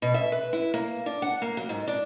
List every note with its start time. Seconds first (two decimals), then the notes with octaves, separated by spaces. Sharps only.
0.02 B2
0.14 E5
0.32 B4
0.53 E4
0.74 A#3
1.06 D4
1.22 F#5
1.42 A#3
1.57 F#3
1.69 G#2
1.87 D4